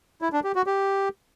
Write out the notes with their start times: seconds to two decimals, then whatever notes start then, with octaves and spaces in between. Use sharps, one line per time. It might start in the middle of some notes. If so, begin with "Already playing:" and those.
0.22 E4
0.33 D4
0.44 G4
0.55 F#4
0.67 G4